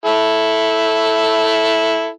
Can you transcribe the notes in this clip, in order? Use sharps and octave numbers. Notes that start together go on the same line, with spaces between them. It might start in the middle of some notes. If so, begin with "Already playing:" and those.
E4 A4